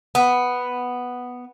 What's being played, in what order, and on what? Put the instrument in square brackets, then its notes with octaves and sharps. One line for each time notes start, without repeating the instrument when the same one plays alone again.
[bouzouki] B3